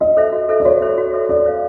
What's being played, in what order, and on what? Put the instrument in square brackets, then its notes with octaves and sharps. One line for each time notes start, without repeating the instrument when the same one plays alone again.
[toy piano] F#4 [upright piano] D#5
[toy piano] A4 C5 E5
F#4
A4 C5 E5
[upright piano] D5
[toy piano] F#4 [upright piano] C#5
[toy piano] A4 C5 E5
F#4
A4 C5 E5
[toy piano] A4 [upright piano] D5
[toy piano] C5 F5